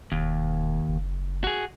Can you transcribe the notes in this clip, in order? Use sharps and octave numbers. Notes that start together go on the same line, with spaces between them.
E1 D#2
F#1
F#4 G#4